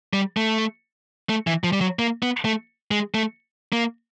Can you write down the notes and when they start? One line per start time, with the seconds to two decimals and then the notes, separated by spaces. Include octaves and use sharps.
0.13 G3
0.37 A3
1.29 A3
1.47 E3
1.64 F3
1.73 G3
1.81 F#3
1.99 A#3
2.23 B3
2.45 A3
2.91 G#3
3.15 A3
3.73 A#3